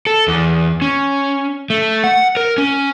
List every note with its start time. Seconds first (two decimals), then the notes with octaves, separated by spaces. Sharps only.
0.07 A4
0.28 E2
0.82 C#4
1.70 A3
2.04 F#5
2.37 A#4
2.58 C#4